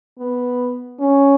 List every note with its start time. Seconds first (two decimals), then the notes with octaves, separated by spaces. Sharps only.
0.19 B3
1.00 C#4